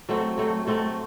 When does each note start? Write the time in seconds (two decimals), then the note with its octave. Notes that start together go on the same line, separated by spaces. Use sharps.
0.09 F#3 A3 C4
0.38 F#3 A3 C4
0.67 F#3 A3 C4